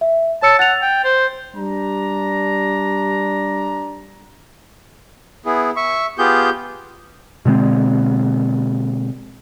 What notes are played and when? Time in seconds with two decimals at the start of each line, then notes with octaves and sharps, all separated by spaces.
0.01 E5
0.42 C#5 A5 E6 C#7
0.59 F#5 A6 F7
0.82 G5
1.04 C5
1.56 G3 D4 A#5
5.45 B3 E4 G#4
5.76 E5 C#6
6.18 B3 F4 G4 G#4 G6
7.45 B2 D3 G#3 C4